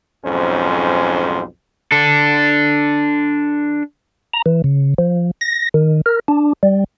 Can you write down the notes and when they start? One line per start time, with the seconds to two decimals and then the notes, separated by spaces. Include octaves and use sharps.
0.25 B1 F2 G#2 C#4 C5
1.92 D4 A4
4.33 A#5
4.46 E3
4.64 C#3
4.98 F3
5.41 A#6
5.74 D#3
6.06 A#4
6.28 D4
6.63 G3